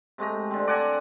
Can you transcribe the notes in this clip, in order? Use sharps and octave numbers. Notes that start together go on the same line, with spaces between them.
C3 G#3 A3 A#5
D3 C4
D5 F#5 G#5 A#5